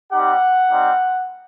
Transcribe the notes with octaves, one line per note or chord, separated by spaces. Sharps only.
G3 C4 D#4 G4 F#5
G3 C4 D#4